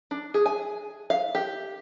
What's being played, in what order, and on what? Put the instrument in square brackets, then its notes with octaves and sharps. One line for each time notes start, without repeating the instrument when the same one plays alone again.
[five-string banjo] D4
G#4
G#5
F5
G4